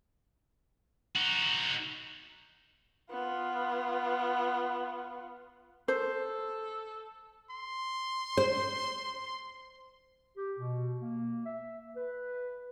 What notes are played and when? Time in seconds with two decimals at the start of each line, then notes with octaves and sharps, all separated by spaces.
1.16 D#4 F#4
3.10 B3 F4
5.88 A4 C5
7.51 C6
8.37 C5
10.36 G4
10.58 B2
11.01 A#3
11.45 E5
11.95 B4